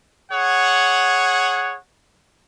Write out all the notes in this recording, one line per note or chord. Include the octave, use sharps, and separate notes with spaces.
G#4 C#5 F#5